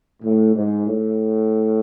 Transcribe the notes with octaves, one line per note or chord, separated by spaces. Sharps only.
A2
G#2
A2